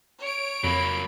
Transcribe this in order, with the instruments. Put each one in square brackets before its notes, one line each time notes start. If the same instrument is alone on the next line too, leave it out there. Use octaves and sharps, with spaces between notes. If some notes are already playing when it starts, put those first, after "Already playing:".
[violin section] C#5 D7
[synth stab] F2 [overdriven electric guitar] F#3 A#3 [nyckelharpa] B5